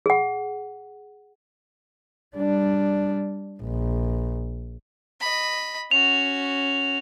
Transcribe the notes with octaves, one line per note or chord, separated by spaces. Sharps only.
G#4 F#5
G3 D4
A#1
D#5 B5
C#4 F#4 F7